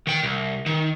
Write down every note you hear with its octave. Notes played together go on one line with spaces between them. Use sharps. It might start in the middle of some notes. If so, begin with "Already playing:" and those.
D#3 G5
C2
D#3